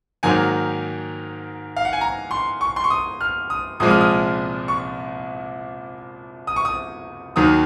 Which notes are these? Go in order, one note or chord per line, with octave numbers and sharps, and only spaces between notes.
G#2 D#3 F#3 A#3 G#5
F5
F#5
G#5
A#5
C6
C#6
C6
C#6
D#6
F6
D#6
C2 A#2 F3 G#3 D#6
F6
D#6
C#6
D#6
C#6
D#6
D#2 D#3 F#3 D#6